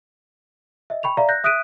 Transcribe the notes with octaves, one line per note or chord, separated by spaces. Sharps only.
D#5 E5
G5 B5 C#6 F7
D5 E5 F5 A#5
F#6 G6 A#6
E5 D#6 F#6 B6 D7 D#7